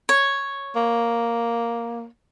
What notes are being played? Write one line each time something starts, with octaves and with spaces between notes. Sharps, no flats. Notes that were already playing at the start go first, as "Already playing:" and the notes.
C#5
A#3